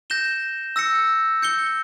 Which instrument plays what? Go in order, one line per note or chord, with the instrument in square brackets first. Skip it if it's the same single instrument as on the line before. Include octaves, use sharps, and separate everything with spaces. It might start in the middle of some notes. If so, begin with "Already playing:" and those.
[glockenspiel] G6 A#6 E7 G7
E6 A#6 C#7
G6 C#7 G7